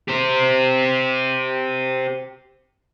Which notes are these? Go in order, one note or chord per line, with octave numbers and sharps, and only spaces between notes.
G4 C5